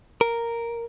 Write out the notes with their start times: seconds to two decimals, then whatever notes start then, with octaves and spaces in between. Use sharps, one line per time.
0.21 A#4